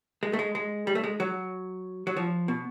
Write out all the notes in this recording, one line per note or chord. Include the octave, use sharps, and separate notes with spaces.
G#3
A3
G#3
G#3
G3
A3
G#3
F#3
F#3
F3
B2